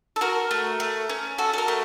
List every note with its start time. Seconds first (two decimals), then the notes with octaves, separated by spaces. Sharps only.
0.16 A4
0.21 F#4 A#4
0.51 A3
0.80 A3
1.09 C#4
1.38 F#4 A4
1.53 A4
1.58 A#4
1.68 A3